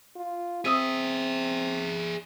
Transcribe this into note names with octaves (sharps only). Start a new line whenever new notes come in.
F4
C4 G#4 E5 D#6 E6 D#7